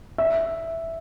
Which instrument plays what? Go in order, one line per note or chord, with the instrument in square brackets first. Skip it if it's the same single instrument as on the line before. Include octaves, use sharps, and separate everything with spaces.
[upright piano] E5